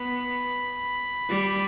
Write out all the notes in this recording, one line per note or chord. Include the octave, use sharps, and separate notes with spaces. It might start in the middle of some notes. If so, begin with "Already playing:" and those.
Already playing: B3 B5
G3